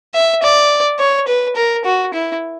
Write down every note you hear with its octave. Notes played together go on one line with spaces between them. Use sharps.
E5
D5
C#5
B4
A#4
F#4
E4